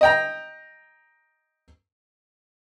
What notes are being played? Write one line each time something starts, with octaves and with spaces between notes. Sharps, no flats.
D#5 G5 A#5